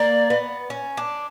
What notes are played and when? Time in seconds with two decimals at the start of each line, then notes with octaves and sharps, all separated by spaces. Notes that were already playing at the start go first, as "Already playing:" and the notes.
Already playing: A#3 D5
0.30 B3
0.70 C#4
0.97 D4